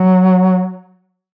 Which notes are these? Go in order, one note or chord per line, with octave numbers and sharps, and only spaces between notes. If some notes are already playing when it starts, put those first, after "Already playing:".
Already playing: F#3